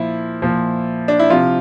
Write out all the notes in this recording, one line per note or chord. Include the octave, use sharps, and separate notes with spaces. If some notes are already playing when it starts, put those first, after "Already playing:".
Already playing: A#2 F3 E4
A#2 F3
D4
E4
C3 F3 F4